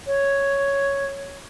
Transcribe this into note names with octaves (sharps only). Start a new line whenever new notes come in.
C#5